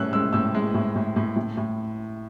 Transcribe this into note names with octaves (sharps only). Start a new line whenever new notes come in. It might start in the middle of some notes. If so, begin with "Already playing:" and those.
Already playing: A2 C#4 E6 F#6
G#3 E6
A2 E6
G#3
A2
A2
A2
A2
A2